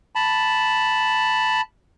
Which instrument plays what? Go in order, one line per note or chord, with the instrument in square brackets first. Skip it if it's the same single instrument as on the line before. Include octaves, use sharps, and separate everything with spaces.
[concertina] A5 B5